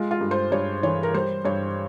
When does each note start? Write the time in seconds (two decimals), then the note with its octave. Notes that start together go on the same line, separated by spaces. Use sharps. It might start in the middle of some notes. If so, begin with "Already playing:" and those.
Already playing: G#3 F4
0.11 F4
0.21 G2
0.31 C5
0.52 G2 C#5
0.83 E3 C#5
1.03 A#4
1.14 G3 C5
1.45 G2 C#5